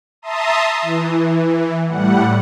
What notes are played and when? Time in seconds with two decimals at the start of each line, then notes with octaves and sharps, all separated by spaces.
0.22 E5 A5 A#5 C6 D#6
0.82 E3
1.87 A2 G3 F#5